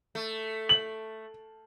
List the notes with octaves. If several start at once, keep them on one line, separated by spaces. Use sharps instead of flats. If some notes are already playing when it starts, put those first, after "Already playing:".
A3
F#7